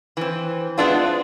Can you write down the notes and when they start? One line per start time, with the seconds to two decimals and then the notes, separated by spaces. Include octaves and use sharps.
0.17 E3 C4
0.78 G#3 B3 C4 D4 E4 F4